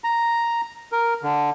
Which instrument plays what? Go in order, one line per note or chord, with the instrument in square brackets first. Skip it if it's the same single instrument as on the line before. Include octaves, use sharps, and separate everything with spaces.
[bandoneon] A#5
A#4
D3